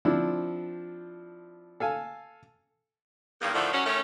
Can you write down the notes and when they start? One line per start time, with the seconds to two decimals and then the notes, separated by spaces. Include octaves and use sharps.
0.05 F3 C4 D4 E4
1.80 A4 F5 G#5
3.41 E2 G2 D#3 A#3
3.54 A2 D3 D#3 F3 A3
3.73 F#3 C#4
3.86 D#3 A3 C#4